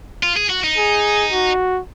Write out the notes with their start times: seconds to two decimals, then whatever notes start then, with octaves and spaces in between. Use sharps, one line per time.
0.23 F4
0.37 G#4
0.50 F#4
0.63 D#4
0.77 G#4
1.32 F#4